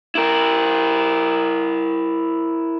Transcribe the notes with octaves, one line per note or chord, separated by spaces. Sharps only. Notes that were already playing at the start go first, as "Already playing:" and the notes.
E4 A#4